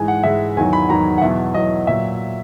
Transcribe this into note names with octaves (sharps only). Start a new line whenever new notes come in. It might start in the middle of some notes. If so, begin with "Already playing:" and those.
Already playing: G#2 E3 G#3 G#5
F#5
G#2 E3 G#3 E5
E2 D#3 F#3 G#5
B5
E2 D#3 F#3 A#5
F#5
E2 B2 F#3 E5
E2 B2 F#3 D#5
A#2 F#3 E5